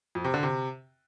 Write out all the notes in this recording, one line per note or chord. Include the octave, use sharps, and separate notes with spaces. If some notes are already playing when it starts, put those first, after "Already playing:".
F2
C3
D3
C3